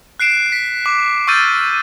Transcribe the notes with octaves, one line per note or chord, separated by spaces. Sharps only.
F#6 C7 D7 E7
B6
D6
C#6 E6 F6 G6 A6 D#7